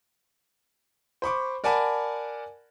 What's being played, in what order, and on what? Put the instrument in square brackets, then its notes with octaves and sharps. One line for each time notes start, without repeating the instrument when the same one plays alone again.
[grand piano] C5 B5 C#6 D6
A#4 D5 F#5 G#5 A5 B5